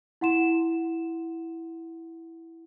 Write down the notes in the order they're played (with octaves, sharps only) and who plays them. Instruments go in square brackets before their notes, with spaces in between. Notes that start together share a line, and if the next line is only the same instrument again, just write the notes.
[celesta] E4 F#5 C6 E7